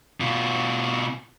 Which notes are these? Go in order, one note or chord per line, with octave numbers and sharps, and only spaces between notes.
B2 F4